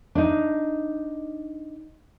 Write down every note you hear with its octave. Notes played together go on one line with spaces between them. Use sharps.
D4 D#4